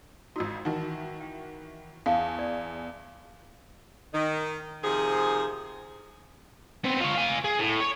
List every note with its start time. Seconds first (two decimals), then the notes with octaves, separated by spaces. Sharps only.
0.36 G#1 D#4 F#4 E6
0.65 D#3 E3 D#4 F#4
1.20 G5
2.06 E2 F5 G#5 A5
2.39 D5
4.14 D#3
4.83 C3 D#3 F3 G#4
6.84 B3 C4
7.00 F4 C#5
7.15 F4 G#5
7.44 G#4
7.59 A2
7.81 C#5